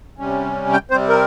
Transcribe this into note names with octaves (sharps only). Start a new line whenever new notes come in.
C3 G3 C#4
G5
C3 G3 C4 C5
A#4